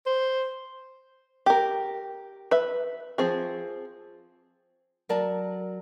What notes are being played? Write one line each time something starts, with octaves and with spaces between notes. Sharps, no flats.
C5
G4 A#4
B4 E5
F3 C4 G#4
F#3 A#4 D5 A5